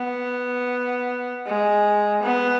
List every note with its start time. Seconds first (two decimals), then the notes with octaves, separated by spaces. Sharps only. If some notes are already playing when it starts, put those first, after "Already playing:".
Already playing: B3
1.46 G#3
2.23 B3